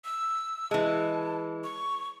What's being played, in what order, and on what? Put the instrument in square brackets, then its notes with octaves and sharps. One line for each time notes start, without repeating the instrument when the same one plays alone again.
[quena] E6
[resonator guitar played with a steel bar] E3 G#3 [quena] A5
[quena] C#6